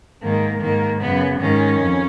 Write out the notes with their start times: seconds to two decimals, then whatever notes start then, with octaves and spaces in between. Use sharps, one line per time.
0.21 G#2 D#3 A#3
0.60 G#2 D#3 A#3
1.00 F#2 C#3 B3
1.39 G#2 D#3 C#4
1.78 F2